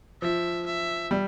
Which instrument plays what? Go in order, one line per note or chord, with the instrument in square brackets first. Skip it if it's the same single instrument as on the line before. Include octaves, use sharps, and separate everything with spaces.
[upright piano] F3 [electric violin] E5
[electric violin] E5
[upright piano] G3